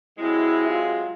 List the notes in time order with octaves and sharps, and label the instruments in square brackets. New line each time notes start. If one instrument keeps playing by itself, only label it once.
[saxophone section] C3 F#3 G#3 [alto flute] E4
[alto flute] F4